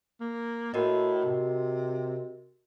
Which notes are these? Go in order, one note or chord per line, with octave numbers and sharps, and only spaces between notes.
A#3
A2 F#4 A#4 D#5
C3